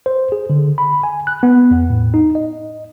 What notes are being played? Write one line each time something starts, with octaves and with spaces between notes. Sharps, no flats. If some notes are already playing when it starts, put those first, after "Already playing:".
C5
G#4
D3
B5
G#5
F#6
B3
E2
A2
D#4
D#5